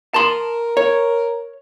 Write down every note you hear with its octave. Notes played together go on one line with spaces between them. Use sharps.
A#4 A5 C6
A#4 C#5